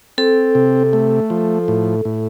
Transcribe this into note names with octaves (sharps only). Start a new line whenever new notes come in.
C4 A4
C3
A3
F3
A2
A2